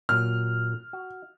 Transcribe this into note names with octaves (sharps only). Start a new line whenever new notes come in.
A#2 F#3 F6
F#4